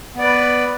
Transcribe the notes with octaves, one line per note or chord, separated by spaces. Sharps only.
B3 B4 D5